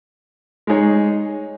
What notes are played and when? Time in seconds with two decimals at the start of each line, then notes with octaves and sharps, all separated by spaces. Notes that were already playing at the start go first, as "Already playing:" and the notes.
0.67 G#3 D#4 G#4 C#5